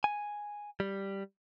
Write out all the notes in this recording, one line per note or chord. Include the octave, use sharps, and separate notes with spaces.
G#5
G3